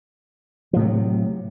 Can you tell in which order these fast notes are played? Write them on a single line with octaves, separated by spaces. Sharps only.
F3 A2 C3 F#3